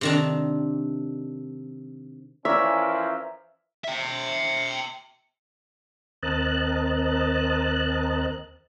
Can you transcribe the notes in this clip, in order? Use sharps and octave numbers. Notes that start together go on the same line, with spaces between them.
C3 D#3 D4
E3 F3 C#4 A#4 C#5 D5 E5
E5 G5
D#2 C4 A#4 D#5 A5 F#6